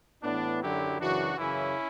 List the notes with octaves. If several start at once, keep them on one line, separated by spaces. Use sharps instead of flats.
A2 E3 B3 D4
F#2 D3 F#3 E4 G4
F#2 C#3 E3 D4 F#4
F#2 C#3 E3 C#4 E4